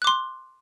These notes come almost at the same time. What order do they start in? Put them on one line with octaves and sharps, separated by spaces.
F#6 D6 C6